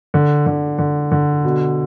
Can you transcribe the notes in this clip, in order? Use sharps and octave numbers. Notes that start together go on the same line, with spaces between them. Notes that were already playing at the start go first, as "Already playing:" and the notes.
D3
D3
D3
D3
B2